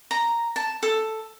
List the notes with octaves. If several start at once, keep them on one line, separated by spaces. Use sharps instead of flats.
A#5
A5
A4